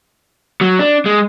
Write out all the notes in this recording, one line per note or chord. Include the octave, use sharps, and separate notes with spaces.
F#3
D4
G#3